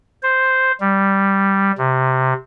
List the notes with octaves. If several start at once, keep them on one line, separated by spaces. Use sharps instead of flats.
C5
G3
C3